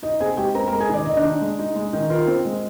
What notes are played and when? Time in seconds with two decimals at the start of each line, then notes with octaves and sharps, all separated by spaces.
0.03 D#4 D#5
0.20 C4 G#4 G#5
0.37 G#3 G4 G5
0.54 C4 A#4 A#5
0.67 A#4 A#5
0.71 G#3
0.80 G#4 G#5
0.89 D#3 D5
1.05 D#3 D#5
1.17 D4 D5
1.24 D#4
1.41 G#3
1.59 D#4
1.75 G#3
1.93 D#3
2.10 F4 A#4
2.27 C4
2.45 G#3